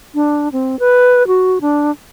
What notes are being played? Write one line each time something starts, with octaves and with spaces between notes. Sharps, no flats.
D4
C4
B4
F#4
D4